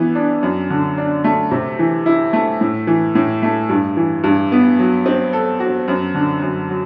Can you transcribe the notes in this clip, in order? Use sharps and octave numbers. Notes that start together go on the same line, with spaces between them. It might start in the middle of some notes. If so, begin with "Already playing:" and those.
Already playing: E3 B3
D4
F#2
D3
D4
A3
C3
E3
E4
A3
A2
E3
A2
A3
G2
E3
G2
B3
F#3
C4
A4
F#4
F#2
D3
F#2
F#3